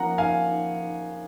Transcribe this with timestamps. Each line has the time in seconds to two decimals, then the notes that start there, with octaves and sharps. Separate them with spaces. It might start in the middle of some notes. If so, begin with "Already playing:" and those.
Already playing: F3 A#3 C#4 F#5 A#5
0.18 F5 G#5